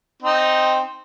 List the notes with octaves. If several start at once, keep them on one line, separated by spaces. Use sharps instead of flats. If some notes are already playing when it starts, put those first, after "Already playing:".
C4 D#4